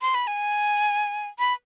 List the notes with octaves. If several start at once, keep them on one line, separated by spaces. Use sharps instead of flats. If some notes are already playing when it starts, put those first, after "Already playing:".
C6
B5
G#5
B5